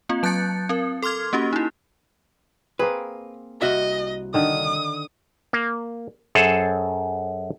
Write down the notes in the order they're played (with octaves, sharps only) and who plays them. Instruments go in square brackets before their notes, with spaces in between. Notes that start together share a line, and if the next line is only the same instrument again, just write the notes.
[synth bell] A#3 C4 F4
F#3 A5 F#6 G6 A6 C#7
C4 A#4
A4 C6 D6 F6 G#6
A#3 C#4 F#4 G4
D#4 E4
[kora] A#3 C4 G#4 [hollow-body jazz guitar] B4
[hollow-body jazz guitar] C2 F#4 E5 [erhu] D#5
[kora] D3 D#3 [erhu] D#6
[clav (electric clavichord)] A#3
F#2 G#4 A4 C5 C#5